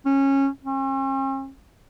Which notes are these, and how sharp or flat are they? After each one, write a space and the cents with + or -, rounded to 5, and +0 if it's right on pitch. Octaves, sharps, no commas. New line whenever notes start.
C#4 -20
C#4 -45